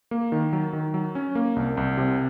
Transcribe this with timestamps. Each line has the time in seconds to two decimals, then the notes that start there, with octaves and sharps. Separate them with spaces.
0.11 A#3
0.32 D#3
0.53 F#3
0.73 D#3
0.94 F#3
1.15 C#4
1.35 A#3
1.56 C2
1.77 C2
1.97 C3